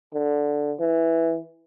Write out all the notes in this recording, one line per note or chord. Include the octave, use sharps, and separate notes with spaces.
D3
E3